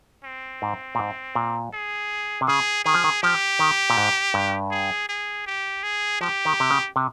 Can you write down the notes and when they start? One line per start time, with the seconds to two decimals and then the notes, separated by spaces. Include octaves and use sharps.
0.24 C4
0.62 G#2
0.95 A#2
0.99 G#2
1.35 A#2
1.73 G#4
2.41 C3
2.48 C#3 G#4
2.85 D#3 G#4
2.94 F3
3.04 D#3
3.22 F3 G4
3.59 D#3
3.90 A#2
3.98 G#2
4.34 G2
4.71 G#4
5.09 G#4
5.47 G4
5.83 G#4
6.21 F3 G4
6.45 D#3
6.60 C3
6.71 C#3
6.96 C3